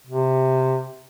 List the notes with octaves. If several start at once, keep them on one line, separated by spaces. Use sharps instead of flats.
C3